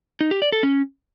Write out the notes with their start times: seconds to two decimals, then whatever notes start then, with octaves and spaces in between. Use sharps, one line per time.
0.21 D#4
0.31 G4
0.42 D5
0.52 A4
0.63 C#4